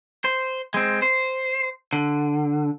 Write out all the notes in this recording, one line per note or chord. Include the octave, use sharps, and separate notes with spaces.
C5
G#3 C4
C5
D3